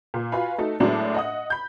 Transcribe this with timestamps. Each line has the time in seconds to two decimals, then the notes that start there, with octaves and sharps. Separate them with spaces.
0.14 A#2
0.32 F4 F#4 B4 F5 G#5 B5
0.58 A3 D#4 F#4 A4
0.80 A2 F#3 G#3 B3 D4 F#4
1.15 D#5 F#5 D#6
1.50 B5 G6